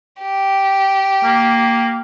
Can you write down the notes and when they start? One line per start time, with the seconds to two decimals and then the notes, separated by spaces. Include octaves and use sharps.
0.22 G4
1.24 A#3